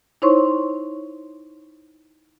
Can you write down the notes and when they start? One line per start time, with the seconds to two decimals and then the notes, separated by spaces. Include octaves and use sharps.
0.22 D#4 E4 C5 C#5 C6 C#6